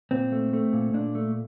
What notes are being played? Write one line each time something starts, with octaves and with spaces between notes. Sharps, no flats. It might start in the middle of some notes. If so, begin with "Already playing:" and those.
A#2 C4
A3
A3
A#2
A#2 D4
A3